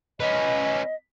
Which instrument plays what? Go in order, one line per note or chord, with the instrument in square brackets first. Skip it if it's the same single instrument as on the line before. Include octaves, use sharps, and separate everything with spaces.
[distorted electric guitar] C#4 B4 [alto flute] D#5